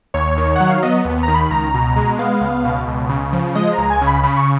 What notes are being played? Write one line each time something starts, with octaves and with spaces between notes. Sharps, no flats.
D#2 C#5
D#3
F#3 F#5
F5
B3 D#5
D#2
D#3 A#5
B5
C#2 A#5
B2
G#3
B3 F5
C#2
B2
C#2
C#3
F3
G#3 D#5
C#2 A#5
G#5
C#3
B5
C#3 B5
C#6